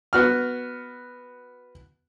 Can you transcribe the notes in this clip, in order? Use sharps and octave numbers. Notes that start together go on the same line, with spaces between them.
B3 F#4 F6